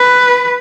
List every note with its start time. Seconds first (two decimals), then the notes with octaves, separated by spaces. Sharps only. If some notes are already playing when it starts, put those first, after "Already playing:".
Already playing: B4